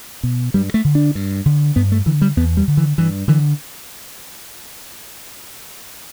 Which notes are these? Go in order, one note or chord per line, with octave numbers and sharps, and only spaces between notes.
B2
G2 G3
A3
D3
D4
G2
D3
G2 B3
A3
D3 E3
G3
E2 B3
G3
D3
E3
G2 E3
D3 E3